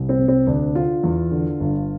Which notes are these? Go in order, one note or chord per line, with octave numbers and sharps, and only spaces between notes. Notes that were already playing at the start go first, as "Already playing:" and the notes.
Already playing: C2
C4
C3
C4
D2 D4
D3 F4
E2
D3
G1